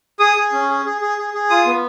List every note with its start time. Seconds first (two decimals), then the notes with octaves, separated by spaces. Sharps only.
0.19 G#4 D#6
0.36 G#4
0.53 C#4
0.69 G#4
0.86 G#4
1.01 G#4
1.18 G#4
1.34 G#4
1.50 F4 D#6
1.66 B3